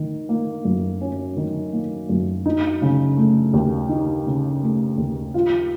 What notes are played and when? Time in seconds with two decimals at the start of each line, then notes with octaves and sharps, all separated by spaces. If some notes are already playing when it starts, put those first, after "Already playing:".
Already playing: D#3
0.29 A#3
0.65 F#2
1.01 C#4
1.37 D#3
1.73 A#3
2.09 F#2
2.46 D#4
2.82 C#3
3.17 A3
3.54 D#2
3.89 D#4
4.26 C#3
4.62 A3
4.98 D#2
5.34 F4